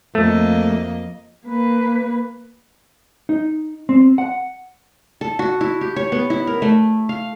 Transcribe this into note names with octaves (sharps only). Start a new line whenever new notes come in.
F2 A3 A#3 D#5
A#3 B4
D#4
C4
F#5
A4
F#4
E4
G4
C#5
B3
E4
A#4
A3
F5